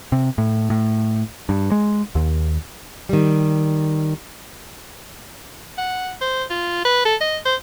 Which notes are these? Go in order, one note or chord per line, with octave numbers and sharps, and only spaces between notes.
C3
A2
A2
G2
G#3
D#2
D#3 G3
F#5
C5
F4
B4
A4
D#5
C5